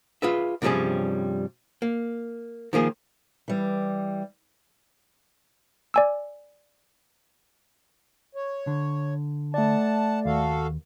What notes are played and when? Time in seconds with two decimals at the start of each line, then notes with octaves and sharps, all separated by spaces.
0.22 F4 G#4 B4 E5
0.62 G2 C3 F3 G3 C#4 G#4
1.82 A#3
2.73 D#3 F3 A#3 G#4
3.48 E3 G3
5.94 D5 G#5 E6
8.35 C#5
8.67 D3
9.54 A3 D5 F#5 A5
10.25 D#2 F#4 A4 F5